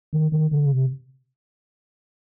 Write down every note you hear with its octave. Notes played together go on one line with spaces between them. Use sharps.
D#3
D#3
D3
C#3
C3